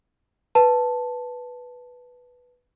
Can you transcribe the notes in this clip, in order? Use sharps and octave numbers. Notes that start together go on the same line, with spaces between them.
B4 A5